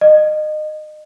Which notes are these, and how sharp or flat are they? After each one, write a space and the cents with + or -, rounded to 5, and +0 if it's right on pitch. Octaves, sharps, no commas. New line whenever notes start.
D#5 -25